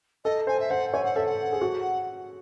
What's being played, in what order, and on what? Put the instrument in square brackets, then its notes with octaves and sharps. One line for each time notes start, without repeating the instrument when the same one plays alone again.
[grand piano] A4 [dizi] D#5
[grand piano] C5 [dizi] G#5
[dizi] E5
[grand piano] C5 [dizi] F#5
[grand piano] C#5 [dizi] G#5
[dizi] F#5
[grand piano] A4 [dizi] E5
[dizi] F#5
[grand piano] G#4
F#4